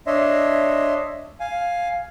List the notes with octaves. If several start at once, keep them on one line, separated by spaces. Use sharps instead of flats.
D4 C#5 D#5 E5 C6
F5 G#5